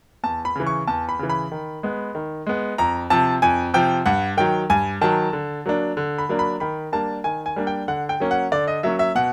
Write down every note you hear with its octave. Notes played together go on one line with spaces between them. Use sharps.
E2 A5
B5
C#3 E3
C#6
E2 A5
B5
C#3 E3
B5
D#3
G#3 B3
D#3
G#3 B3
F2 A#5
C3 F3 A5
F2 G#5
C3 F3 G5
G2 F#5
D#3 F#3 G5
G2 G#5
D#3 F#3 A5
D3
F#3 A#3 D4
D3
B5
F#3 A#3 D4
B5
D#3 B5
G3 A#3 D4 A5
D#3 G#5
G#5
G3 A#3 D4
G5
D3 F#5
G5
F#3 A#3 C#4
F#5
D3 D5
D#5
F#3 A#3 C#4 E5
E5
B2 F#5